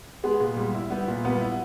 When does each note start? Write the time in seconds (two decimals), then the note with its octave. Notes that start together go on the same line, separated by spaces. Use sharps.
0.24 G#3 B3 G#4
0.40 A#2
0.57 G3
0.75 E4
0.90 G3 B3 G4
1.08 A#2
1.24 G3 B3 B4
1.41 E4